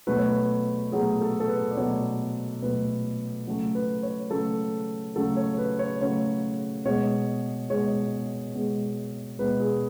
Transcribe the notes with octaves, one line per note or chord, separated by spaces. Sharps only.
B2 F#3 A3 B4
C#5
B4
B2 F#3 A3 G#4
A4
A4
B4
D5
B2 F#3 A3 C#5
B2 F#3 A3 B4
C#3 F#3 A3
B4
C#5
C#3 F#3 A3 A4
C#3 F#3 A3 A4
C#5
B4
C#5
C#3 F#3 A3 C#5
B2 G#3 C#5
B2 G#3 C#5
B2 G#3
B2 G#3 B4
G#4